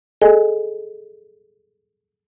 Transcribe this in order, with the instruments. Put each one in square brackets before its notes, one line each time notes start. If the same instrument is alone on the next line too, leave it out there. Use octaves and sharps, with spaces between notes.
[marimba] G#4 A4 D#5 G#5